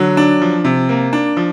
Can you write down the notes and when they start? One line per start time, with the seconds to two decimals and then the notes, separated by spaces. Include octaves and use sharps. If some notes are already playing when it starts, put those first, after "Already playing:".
Already playing: D3 F#3
0.17 D4
0.42 F3
0.65 C3
0.89 A#3
1.13 D4
1.37 F3